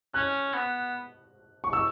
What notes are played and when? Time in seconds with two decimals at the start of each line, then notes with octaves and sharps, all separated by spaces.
0.14 C#4 F#6
0.54 B3
1.64 C#6
1.73 E6